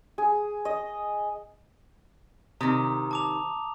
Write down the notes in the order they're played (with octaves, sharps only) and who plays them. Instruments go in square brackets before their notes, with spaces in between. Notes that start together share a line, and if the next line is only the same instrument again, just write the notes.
[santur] G#4
D#5
[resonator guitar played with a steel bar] C3 D#3 [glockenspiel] A#5 D#6
[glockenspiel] A5 D6 F7